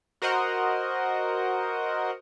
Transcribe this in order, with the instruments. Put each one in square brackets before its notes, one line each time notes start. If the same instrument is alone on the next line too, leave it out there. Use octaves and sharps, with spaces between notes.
[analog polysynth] F#4 A#4 C5 D#5 F#5